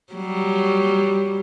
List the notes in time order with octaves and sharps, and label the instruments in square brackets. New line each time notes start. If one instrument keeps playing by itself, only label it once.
[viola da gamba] F#3 G3